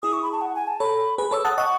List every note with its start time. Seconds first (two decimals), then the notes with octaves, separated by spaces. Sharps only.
0.03 E4 G#4 D#6
0.13 C#6
0.23 B5
0.32 A5
0.41 F#5
0.55 G#5
0.67 A5
0.80 A4 C#5 B5
1.18 G#4 B4 B5
1.31 A4 C#5 E6
1.45 F#5 A5 D#6
1.58 D#5 F#5 C#6